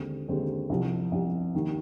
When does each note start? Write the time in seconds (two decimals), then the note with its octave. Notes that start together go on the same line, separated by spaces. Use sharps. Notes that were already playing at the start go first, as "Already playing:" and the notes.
Already playing: D#2 D3 G#3 C4
0.28 D#2 D3 G#3 C4
0.69 C2 C3 F3
1.12 C2 C3 F3
1.54 D#2 D#3 A#3